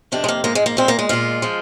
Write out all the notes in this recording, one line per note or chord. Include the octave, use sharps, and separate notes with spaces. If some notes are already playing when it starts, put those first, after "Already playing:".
F2 C3 D#3 D4
G#3
A#3
G#2 F3 G#3 A#3
G#3
A#3
A#2 G#3 C4
A#3
G#3
A#2 G#3 F4
F3 G#3